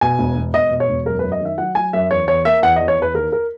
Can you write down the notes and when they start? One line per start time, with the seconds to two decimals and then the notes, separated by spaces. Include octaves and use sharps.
0.01 B2 G#5
0.19 E1
0.36 E1
0.54 E1 D#5
0.71 B2
0.80 C#5
0.88 E1
1.06 F#2 A#4
1.19 B4
1.23 F#2
1.32 D#5
1.41 D#3 E5
1.58 F#3 F#5
1.75 F#3 G#5
1.93 F#2 E5
2.10 E2 C#5
2.28 E2 C#5
2.45 A#3 E5
2.63 E2 F#5
2.76 D#5
2.80 E2
2.88 C#5
2.98 E2 B4
3.14 D#2 A#4
3.32 A#4